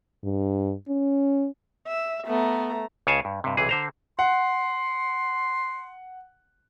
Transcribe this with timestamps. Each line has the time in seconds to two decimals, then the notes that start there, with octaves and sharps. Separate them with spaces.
0.24 G2
0.89 C#4
1.88 E5
2.27 A3 B3 A#5
3.07 C#2 C#3 C#5 F5 G#5 A5
3.25 G2
3.44 G2 C3
3.57 B1 C3 E3 G#4
3.69 D3 C5 A#5
4.19 F#5 C6